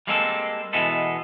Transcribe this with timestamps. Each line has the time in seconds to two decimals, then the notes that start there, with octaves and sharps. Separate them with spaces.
0.07 G3 G#3 A#3 C4 F4 A4
0.73 B2 E3 G#3 B3 A4